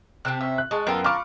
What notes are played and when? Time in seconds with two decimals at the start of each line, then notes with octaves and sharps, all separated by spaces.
0.25 C3 C4 G4 A5 F#6
0.41 C#4 E5
0.58 F#6
0.71 G#3 G#5 A5 C#6
0.87 F#2 B3 F4 A4 A#4 G5
1.04 F4 A#4 A5 B5 C#6 D6 F6